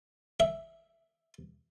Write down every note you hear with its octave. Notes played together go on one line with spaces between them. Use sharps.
E5